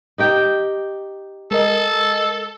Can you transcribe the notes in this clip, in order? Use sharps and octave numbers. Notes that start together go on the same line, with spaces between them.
D#4 G4 G5
G#3 A4 A#4 D#5